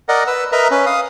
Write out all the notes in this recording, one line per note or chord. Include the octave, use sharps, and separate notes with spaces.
A#4 D5 D#5 F#5
B4 E6
A#4 B4 D#5 E5 A#5
C#4 B4
F5 D#6